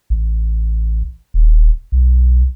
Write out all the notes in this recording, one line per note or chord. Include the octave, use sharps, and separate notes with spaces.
A1
D#1
B1